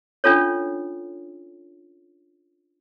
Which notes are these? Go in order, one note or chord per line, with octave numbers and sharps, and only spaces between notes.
C#4 D4 F4 A4 C#5